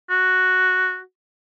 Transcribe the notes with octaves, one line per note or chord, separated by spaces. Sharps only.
F#4